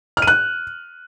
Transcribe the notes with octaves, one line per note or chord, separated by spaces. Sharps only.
F6
D#7
F#6